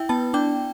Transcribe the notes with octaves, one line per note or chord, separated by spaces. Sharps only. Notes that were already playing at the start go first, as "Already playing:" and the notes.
Already playing: E4 G5
B3 A5
D4 G5